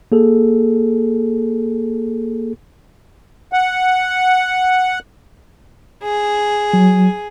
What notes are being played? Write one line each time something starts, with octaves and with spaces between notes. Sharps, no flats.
A#3 G#4 A4
F#5
G#4
F#3